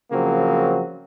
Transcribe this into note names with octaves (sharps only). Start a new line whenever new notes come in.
C#3 F3 F#3 A#3 C4